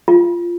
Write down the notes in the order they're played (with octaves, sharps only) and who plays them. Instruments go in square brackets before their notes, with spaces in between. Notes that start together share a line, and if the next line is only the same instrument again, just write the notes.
[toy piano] F4